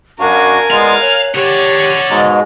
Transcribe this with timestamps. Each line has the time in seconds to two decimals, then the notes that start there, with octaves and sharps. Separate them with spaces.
0.19 F#2 D4 F#4 A#4 F5 G#5
0.71 G#3 B3 F4 D5 F5
1.01 C#5 F#6
1.35 G4 C#5 D5 F#5
2.10 G#2 B2 G#3 A#5